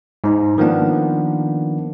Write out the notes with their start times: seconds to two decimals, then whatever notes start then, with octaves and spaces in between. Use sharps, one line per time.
0.24 G#2 D#4
0.58 D#3 F3 A#3 B3 D4